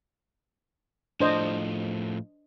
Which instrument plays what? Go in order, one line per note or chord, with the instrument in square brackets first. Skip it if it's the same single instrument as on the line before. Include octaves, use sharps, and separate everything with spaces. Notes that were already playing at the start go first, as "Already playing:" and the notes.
[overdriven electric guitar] A2 F3 [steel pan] D4 C5 D#5